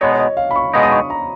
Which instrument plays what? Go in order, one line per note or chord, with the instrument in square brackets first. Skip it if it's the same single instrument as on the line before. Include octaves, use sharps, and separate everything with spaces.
[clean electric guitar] B2 G#3 B3 D#4 [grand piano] C#5
[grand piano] C#5
D#5
F5
B5
C#6
[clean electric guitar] B2 G#3 B3 D#4
[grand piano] D#6
C#6
A#5